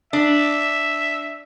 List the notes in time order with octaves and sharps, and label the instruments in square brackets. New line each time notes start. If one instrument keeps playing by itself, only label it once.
[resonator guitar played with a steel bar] D4 [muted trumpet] E5